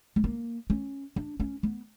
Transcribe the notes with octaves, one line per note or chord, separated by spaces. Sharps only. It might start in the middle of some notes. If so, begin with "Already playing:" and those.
G3
A#3
C#4
D4
C#4
B3